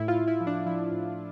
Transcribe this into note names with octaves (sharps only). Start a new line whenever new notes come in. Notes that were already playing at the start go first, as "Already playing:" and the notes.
Already playing: A2 E4
F4
A2
E4
F3
D4
F3 E4
A2